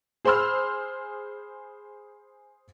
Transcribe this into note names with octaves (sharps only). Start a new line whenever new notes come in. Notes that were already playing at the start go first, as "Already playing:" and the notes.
G#4 C5 B5 C6 E6 F6